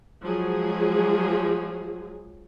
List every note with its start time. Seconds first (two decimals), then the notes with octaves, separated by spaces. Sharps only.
0.22 F3 F#3 G#3 G#4